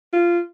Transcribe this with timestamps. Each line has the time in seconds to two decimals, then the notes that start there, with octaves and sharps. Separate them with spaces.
0.13 F4